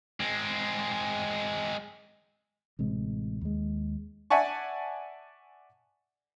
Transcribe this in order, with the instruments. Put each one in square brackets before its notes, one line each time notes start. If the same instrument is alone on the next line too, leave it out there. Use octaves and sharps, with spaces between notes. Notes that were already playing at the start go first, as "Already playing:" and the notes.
[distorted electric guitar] G#3 C4
[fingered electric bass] A1 C3 G#3
D#2 G#3
[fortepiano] D5 E5 F#5 G#5 A5 C#6